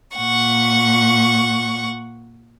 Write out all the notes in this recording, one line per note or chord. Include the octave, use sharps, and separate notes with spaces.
A#2 F#5 C#6